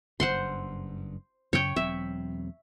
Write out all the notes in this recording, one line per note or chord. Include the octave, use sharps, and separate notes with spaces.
F#1 G2 C5 F#5 C6
F#2 C#3 C#5 G5
E1 F#3 C4 E5